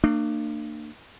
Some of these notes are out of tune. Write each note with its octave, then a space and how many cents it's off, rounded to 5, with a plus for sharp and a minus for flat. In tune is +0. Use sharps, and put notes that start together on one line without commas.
A#3 -35 D4 +35